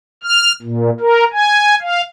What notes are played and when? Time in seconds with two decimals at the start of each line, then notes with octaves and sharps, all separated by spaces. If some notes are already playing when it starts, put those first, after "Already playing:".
0.24 F6
0.62 A#2
1.00 A#4
1.32 G#5
1.81 F5